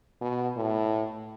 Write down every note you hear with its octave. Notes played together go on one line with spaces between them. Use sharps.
B2
A2